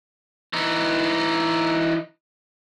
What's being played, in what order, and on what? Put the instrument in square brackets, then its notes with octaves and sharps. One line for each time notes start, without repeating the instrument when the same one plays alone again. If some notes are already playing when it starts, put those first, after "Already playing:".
[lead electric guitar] E3 D#4